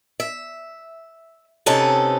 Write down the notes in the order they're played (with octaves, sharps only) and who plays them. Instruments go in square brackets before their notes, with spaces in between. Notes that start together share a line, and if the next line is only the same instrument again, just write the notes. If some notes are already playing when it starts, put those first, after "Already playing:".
[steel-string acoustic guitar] E5
C3 C4 C#4 D#4 A4 B4